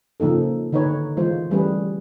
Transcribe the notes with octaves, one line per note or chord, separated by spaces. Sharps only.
C#3 F3 A#3 D#4 A4
D3 D#3 D#4 A#4 B4 C#5
E3 G#3 F4 C5
E3 G3 A3 C#4 G#4 B4